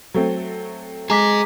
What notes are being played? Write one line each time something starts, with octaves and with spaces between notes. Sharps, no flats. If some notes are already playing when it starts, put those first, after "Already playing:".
F#3 A3 C4
G#3 G#4 A#5 D6 B6